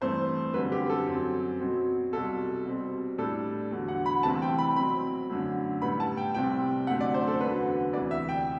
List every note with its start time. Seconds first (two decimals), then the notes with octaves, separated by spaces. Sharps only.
0.01 G2 E3 A3 C4 C5
0.54 F#2 D3 G3 C4 B4
0.72 G4
0.90 A4
1.06 F#2 F#3 C4
1.60 B2 F#3 C4
2.12 C2 B2 G3 A4
2.66 B2 G3 C4
3.18 A2 G3 D4 A4
3.71 E2 D3 F#3
3.88 F#5
4.06 B5
4.23 C2 C3 E3 A3 C4 A5
4.42 G5
4.58 B5
4.76 B2 F#3 C4 B5
5.30 F#2 D3 F#3 A3
5.82 A2 G3 B3 B5
6.00 A5
6.17 G5
6.34 C2 C3 G3 C4 G5
6.87 F#2 D3 A3 C4 F#5
7.01 D5
7.14 C5
7.28 A4
7.40 E2 D3 F#3 B3 B4
7.93 D2 C3 E3 D5
8.11 E5
8.29 G5